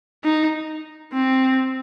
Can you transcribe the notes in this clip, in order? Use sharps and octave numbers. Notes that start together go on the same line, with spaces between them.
D#4
C4